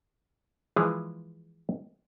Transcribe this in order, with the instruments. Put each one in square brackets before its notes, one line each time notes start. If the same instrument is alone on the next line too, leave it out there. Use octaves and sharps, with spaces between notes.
[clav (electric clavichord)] E3 F3 G#3 E4 G#4